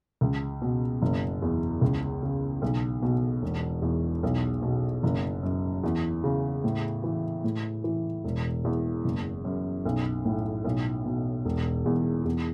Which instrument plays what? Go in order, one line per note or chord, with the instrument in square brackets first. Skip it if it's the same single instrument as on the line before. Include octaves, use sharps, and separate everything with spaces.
[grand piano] C#2
B2
F#1
E2
C#2
C#3
B1
B2
E1
E2
B1
B2
F#1
F#2
E2
C#3
A2
E3
A2
E3
E1
E2
F#1
F#2
B1
A2
B1
B2
E1
E2
E2